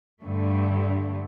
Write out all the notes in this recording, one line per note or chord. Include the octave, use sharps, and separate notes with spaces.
G2 D3 A3